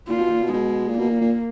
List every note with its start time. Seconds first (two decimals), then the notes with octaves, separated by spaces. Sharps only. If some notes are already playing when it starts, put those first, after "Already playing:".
0.08 A#2 F4
0.20 B2
0.31 A#2
0.42 B2
0.53 B2 G#3
0.89 A#2
0.98 B2 A#3
1.09 A#2
1.21 A#2